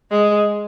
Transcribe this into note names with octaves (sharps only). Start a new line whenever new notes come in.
G#3